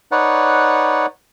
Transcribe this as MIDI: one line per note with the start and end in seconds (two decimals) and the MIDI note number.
0.12 1.06 63
0.12 1.06 71
0.12 1.06 73
0.12 1.06 74
0.12 1.06 78